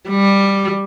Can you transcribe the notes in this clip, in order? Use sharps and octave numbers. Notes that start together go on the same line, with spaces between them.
G3